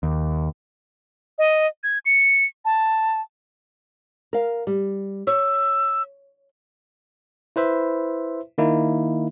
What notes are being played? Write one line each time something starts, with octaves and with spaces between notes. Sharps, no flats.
D#2
D#5
G#6
C#7
A5
A#4 F5
G3
C#5 E6
E4 B4 C5 E5
D#3 A#3 D#4 E4